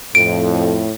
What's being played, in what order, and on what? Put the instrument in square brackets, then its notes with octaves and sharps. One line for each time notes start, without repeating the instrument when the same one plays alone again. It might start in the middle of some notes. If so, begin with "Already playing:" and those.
[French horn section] F2 [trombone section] A2 [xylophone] D7